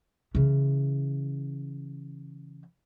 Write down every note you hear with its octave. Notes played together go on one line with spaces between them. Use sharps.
C#3 E3